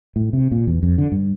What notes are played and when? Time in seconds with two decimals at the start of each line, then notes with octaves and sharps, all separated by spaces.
0.16 A2
0.33 C3
0.52 A#2
0.67 E2
0.83 F2
0.98 D3
1.12 G2